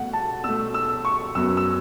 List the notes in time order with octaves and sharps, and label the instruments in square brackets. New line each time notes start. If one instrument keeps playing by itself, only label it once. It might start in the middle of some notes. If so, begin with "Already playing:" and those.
Already playing: [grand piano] B2 A3 F#5
A5
B2 A3 E6
E6
C#6
F#2 F#3 B3 E6
E6